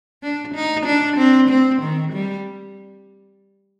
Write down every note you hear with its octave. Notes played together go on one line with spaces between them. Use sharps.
D4
D#4
D4
C4
C4
D#3
G3